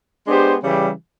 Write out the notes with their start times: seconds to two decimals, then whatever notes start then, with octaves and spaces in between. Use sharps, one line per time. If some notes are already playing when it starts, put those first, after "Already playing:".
0.26 G#3 B3 D4 G4 C5
0.62 C#3 E3 G3